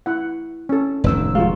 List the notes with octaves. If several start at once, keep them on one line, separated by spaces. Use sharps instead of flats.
E4 F#5
C#4 A4
F1 D#2 A2 D#3 E6
F3 G#3 F4 F#4 F5